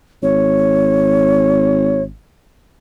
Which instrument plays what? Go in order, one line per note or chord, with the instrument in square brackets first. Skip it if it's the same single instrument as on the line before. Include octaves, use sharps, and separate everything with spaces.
[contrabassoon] G#1 [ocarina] C#5